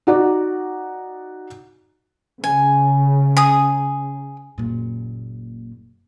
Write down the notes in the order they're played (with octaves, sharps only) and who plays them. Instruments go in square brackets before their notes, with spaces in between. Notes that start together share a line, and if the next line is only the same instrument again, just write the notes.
[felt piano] D#4 F#4 D5
[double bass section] C#3 [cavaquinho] G#5
[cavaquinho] G#4 D#6
[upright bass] F#1 A#2